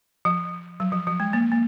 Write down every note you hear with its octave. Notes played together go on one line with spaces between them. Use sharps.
F3
F#3
F3
F3
G#3
A#3
A#3